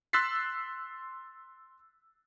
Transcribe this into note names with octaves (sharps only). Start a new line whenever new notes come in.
C6 E6 F#6 A6 B6 C7